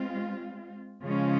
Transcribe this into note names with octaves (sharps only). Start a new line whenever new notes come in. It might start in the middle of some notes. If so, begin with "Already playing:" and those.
Already playing: G#3 C4 F4
C#3 F3 G#3 C#4 F4